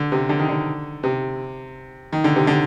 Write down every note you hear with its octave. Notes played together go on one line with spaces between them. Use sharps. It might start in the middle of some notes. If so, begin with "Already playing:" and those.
Already playing: D3
C3
D3
D#3
D3
C3
D#3
D3
C3
D3